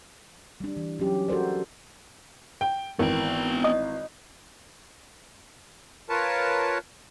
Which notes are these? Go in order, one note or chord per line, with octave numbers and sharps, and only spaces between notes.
G3 D4
E3
F#3 C#4 G4
F#4 A4 A#4 C5 D5
G5
G#1 E3 B3 A#4 G5
D#5 D#6
F4 A#4 B4 C#5 A5